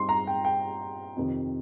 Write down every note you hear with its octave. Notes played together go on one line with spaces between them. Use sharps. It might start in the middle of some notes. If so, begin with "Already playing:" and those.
Already playing: G2 G3 C4 D#4 C6
A#5
G5
G5
F2 C3 D#3